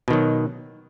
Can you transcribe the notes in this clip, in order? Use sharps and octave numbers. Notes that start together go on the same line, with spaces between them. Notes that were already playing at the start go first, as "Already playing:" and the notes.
B2 D#3 F#3